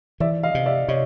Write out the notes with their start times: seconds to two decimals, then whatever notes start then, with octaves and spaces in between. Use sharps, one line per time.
0.20 E3 D5 E5
0.43 D#5 F5
0.55 C3
0.66 D5 E5
0.88 C3 C#5 D#5